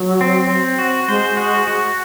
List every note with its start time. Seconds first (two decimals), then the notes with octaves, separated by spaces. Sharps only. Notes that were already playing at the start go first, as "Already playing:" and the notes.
Already playing: F#3
0.21 C4
0.50 C4
0.79 F#4
1.08 G#3 C5
1.37 F#4
1.67 F#4